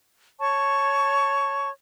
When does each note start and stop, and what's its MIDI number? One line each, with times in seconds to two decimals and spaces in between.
0.39 1.69 73
0.39 1.69 81
0.39 1.69 85